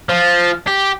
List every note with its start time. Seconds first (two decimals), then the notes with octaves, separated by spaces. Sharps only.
0.09 F3
0.68 G4